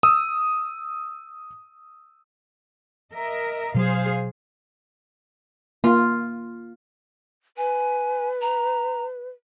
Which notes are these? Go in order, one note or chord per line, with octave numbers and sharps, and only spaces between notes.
D#6 E6
A#4 D#5 E5
B2 F#3 G#4 C5 F5
A#3 F4
B4 G#5
A#5